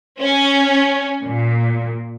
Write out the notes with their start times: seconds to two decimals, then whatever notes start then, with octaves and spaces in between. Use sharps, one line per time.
0.20 C#4
1.24 A#2